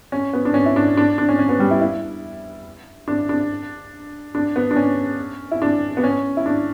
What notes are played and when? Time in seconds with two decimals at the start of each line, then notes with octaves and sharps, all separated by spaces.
0.12 C#4
0.33 B3
0.45 D4
0.54 C#4
0.66 E4
0.76 D4
0.97 D4
1.18 D4
1.29 C#4
1.39 C#4
1.49 B3
1.60 G3
1.71 E4
1.81 E4
3.08 D4
3.29 D4
4.35 D4
4.56 B3
4.71 D4
4.76 C#4
5.51 E4
5.62 D4
5.97 B3
6.04 C#4
6.37 E4
6.46 D4